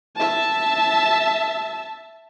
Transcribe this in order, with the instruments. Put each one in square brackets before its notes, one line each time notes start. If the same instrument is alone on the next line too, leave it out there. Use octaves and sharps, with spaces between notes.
[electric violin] E5 A5